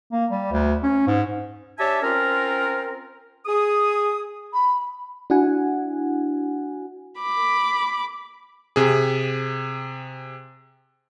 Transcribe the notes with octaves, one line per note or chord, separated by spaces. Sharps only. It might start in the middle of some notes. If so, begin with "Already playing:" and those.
A#3
G3
D2
C#4
G#2
D4 G4 C#5 E5 G#5 A5
C4 C#4 F4 A#4
G#4 D#6
B5
D4 E4 F#4 F#5 G#5
B5 D6
C3 G#4